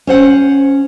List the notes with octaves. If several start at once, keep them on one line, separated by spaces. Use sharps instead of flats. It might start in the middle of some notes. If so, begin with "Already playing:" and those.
C#4 C5 F#5